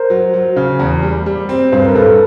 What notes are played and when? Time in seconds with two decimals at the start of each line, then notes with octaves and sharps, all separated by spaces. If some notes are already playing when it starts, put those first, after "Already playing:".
Already playing: A#4 C5
0.10 F#3
0.34 F#3
0.56 C#3
0.79 E2
1.03 G3
1.26 G3
1.49 C4
1.72 G2 C5
1.80 B4
1.86 A#4
1.94 G2 A4 B4